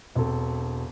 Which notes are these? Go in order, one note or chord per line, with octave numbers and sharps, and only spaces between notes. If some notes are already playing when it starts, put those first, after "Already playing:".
E1 C4 A4